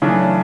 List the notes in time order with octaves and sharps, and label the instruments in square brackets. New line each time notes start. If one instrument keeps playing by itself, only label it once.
[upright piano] C#3 E3 A3 D4 [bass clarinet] F#3